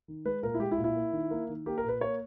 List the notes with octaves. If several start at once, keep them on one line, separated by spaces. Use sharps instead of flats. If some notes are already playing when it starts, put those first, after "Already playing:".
D#3
G#3 B4
A#2 A#4
E4
G#3 G4
E4
A#2
E4
A#3
D#3
A#3
D#3
A#3 G4
A#4
A#2
B4
A#3 C#5